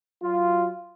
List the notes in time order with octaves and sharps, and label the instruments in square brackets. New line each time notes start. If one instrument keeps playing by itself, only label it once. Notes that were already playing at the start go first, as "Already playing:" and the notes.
[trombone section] F#3 F4